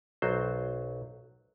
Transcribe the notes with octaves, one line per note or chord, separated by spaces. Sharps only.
B1 F#3 C5